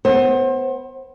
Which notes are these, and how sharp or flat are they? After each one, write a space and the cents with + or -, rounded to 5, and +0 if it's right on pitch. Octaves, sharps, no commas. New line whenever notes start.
B3 +15 C5 +30